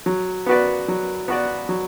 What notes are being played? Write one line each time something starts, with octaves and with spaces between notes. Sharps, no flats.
F#3
B3 F#4 B4 D5
F#3
B3 F#4 B4 D5
F#3